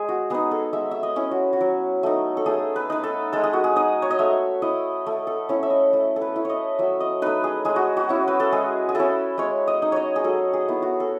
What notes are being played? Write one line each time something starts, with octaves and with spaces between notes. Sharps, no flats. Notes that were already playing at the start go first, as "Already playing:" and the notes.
Already playing: G#3 G#4
F#4
B3 D#4 G#4
A4
G#3 E5
E5
D#5
C#4 E4
F#4
F#4
F#3
A3 D#4
A4
A3 G#4
B4
D#4 B4
A4
G#3 A4
G#4
F#4
G#4
D#4 D#5
C#5
D#5
A3 E5
E4 D#5
A3
A4
C#4 E4 C#5
E5
D#5
A3
A4
B4
E4
C#5 D#5
F#3 E5
D#5
A3 D#4 B4
G#4
G#3 G#4
F#4
F#4
C#4 E4
B4
A4
G#3 G#4
G#4
C#4 E4 A4
G#3 C#5
D#5
D#4
C#5 D#5
G#4
F#3 A4
G#4
B3 E4
F#4
A4